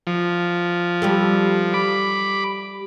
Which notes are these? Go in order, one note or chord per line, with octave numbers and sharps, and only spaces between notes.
F3
G3 G4 A4
B5 D6